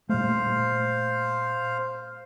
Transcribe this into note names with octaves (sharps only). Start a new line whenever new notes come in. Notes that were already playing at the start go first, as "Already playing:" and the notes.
A#2 G3 A3 C5 F5